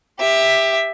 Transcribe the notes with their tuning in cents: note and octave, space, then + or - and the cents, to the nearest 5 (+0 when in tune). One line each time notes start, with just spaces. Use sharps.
G4 +15 E5 +0